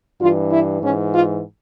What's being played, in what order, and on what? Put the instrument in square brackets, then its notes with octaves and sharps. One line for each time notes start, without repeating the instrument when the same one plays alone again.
[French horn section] G2 E3 F4
E4
G#2 E3 C#4
F4